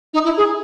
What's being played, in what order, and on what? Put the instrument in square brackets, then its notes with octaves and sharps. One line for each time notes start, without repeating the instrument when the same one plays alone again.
[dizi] D#4
E4
G#4